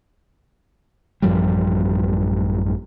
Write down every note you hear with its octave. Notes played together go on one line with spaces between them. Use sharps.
A1 F#2 F3 G3